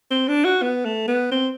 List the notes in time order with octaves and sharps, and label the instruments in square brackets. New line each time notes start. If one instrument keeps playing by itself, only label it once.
[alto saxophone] C4
D4
F#4
B3
A3
B3
C4